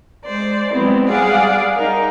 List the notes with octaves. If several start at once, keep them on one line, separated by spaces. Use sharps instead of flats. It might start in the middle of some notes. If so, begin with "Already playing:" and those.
G#3 C5 D5
F#3 G#3 B3 C4 E4
G3 G#4 D5 F5 F#5 D6
D#4 A#4